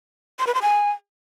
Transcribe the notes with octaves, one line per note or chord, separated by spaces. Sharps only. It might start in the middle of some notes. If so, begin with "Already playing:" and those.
C6
B4
C6
G#5